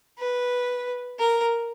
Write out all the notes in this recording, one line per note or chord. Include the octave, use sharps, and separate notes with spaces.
B4
A#4